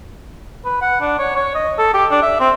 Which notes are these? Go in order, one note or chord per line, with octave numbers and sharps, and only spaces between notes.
B4
F#5
D4
C#5
C#5
D#5
A4
G4
D4
E5
C4